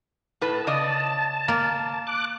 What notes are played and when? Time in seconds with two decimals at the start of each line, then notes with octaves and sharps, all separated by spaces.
0.41 A2 A3 B4 A5
0.67 C#3 D5 D#5
1.48 A#3
2.07 D6 F#6